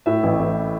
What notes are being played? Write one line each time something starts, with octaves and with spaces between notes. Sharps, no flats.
A2 E5
A1
A1